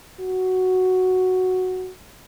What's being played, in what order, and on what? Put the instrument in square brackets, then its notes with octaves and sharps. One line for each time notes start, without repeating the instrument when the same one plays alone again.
[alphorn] F#4